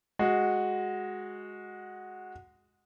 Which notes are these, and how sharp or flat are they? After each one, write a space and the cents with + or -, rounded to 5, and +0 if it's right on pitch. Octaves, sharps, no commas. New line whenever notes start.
G#3 +0 F#4 -5